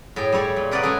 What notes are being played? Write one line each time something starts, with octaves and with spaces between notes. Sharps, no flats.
A2 G#4 G5
G3 E4 C#5 D5
A#2
A#4 B4 D5 D#5 F#5 C6
G#3 A3 C#4 G#4 A4